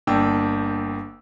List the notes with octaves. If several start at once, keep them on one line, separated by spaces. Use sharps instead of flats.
G1 A#3 D4 G5 E6